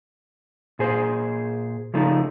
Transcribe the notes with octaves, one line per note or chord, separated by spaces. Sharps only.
A#2 G#4 C5
C#3 F3 A3 D#4